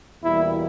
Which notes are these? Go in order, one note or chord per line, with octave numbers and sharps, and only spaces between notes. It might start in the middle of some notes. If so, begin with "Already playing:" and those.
E2 B2 G3 A#3 E4